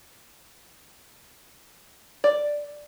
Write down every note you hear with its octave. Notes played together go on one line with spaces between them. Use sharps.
D5